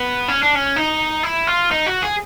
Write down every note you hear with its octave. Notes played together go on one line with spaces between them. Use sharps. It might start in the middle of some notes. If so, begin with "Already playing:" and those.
Already playing: B3
C#4
D4
C#4
D#4
E4
F4
D#4
F#4
G#4